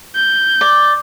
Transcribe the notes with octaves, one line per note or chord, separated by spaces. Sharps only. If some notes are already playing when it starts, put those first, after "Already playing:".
G6
D5